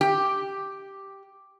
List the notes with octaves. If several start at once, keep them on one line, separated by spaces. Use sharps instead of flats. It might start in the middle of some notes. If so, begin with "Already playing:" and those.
G4